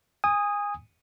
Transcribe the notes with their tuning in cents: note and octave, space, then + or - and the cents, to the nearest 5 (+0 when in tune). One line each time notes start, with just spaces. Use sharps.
G#5 -25 D#6 +0